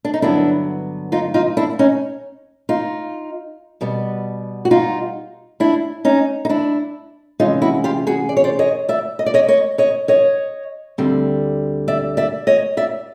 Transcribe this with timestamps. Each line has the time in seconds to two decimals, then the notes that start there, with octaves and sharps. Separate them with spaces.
0.05 D4
0.14 D#4
0.22 G2 D3 F#3 B3 D4 E4
1.12 D#4 F4
1.34 D#4 F4
1.57 D4 E4
1.79 C#4 D#4
2.69 D#4 F4
3.81 B2 G3 B3
4.65 F#4
4.71 D#4 F4
5.60 D4 E4
6.05 C#4 D#4
6.45 D#4
6.49 D4 E4
7.40 C3 E3 G#3 C#4 D#4 F4
7.62 E4 F#4
7.84 F4 G4
8.07 F#4 G#4
8.29 D5
8.37 C#5
8.44 C5 D5
8.59 C#5 D#5
8.89 D5 E5
9.19 D#5
9.26 D5
9.34 C#5 D#5
9.48 C#5 D#5
9.78 C#5 D#5
10.08 C#5 D#5
10.98 D2 D3 G3 C4
11.88 D5 E5
12.17 D5 E5
12.47 C#5 D#5
12.77 D5 E5